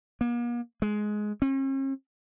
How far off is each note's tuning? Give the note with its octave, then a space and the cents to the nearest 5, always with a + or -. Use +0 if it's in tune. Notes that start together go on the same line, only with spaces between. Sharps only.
A#3 +45
G#3 +15
C#4 -45